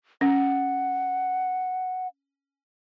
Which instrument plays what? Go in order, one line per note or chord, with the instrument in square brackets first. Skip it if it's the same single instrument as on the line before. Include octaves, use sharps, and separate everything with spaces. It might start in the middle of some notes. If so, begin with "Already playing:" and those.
[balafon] C#4 [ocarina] F#5